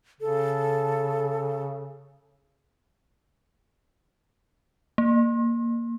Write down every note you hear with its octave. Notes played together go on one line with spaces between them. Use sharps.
C#3 A4
A#3